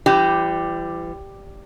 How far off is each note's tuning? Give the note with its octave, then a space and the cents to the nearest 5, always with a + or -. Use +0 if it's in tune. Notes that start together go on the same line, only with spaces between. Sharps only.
E3 +40 G3 +0 G4 +0